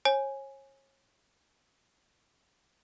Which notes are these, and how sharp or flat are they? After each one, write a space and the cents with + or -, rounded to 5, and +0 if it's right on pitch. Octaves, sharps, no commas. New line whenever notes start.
C#5 -35 G#5 +0